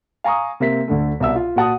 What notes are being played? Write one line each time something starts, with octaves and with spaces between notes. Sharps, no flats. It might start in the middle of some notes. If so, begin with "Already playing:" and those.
F5 G#5 A#5 C#6 D#6
C3 A#3 C4 E5 B6
D2 D3 A3
C2 B2 E5 E6
F4
A#2 F#4 F#5 A5 D#6